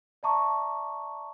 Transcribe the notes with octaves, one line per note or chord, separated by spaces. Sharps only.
D5 E5 A5 A#5 C#6 D6